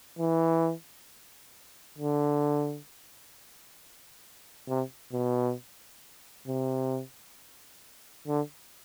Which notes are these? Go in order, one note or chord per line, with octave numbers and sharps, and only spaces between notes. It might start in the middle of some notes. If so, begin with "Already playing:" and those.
E3
D3
C3
B2
C3
D3